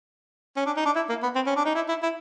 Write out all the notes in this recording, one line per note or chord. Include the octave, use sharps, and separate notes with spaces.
C#4
D4
D#4
D4
E4
A#3
B3
C4
C#4
D4
D#4
E4
E4
E4